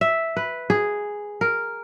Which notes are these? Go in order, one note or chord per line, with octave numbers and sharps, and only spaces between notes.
E5
B4
G#4
A#4